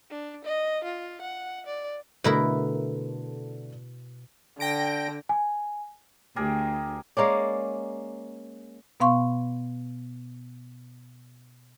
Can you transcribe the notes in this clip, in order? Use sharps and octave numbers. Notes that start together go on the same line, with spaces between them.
D4
D#5
F4
F#5
D5
B2 D3 A3 E4 A#4
D3 G5 A#6 D7
G#5
D2 G4 G#4 A#4
G#3 A#3 C#4 D5
B2 B3 F5 C6 C#6